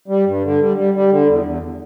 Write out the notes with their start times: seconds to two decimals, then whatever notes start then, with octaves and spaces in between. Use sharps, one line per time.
0.08 G3
0.26 G2
0.43 D3
0.60 G3
0.77 G3
0.94 G3
1.11 D3
1.28 E2
1.45 E2